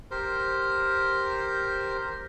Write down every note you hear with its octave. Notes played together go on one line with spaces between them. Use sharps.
G4 A#4 C5